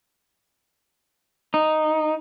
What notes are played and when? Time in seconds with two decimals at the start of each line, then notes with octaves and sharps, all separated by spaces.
1.54 D#4